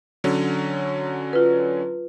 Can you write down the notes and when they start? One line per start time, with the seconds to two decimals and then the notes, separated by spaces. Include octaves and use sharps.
0.24 D3 F#3 C#4
1.33 F4 B4